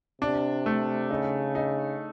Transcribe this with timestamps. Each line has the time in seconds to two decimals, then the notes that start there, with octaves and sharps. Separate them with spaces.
0.21 C3 D4
0.66 A3
1.10 C#3 D#4
1.55 D#4